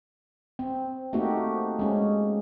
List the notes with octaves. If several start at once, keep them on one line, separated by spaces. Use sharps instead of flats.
C4
A3 A#3 C4 D#4 F#4 G4
G#3 C#4